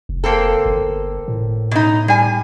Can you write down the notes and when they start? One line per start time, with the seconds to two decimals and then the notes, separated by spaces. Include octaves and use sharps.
0.09 F1
0.24 A#3 C4 A4
0.65 G1
1.28 A2
1.71 B2 D#4
2.08 G3 G#5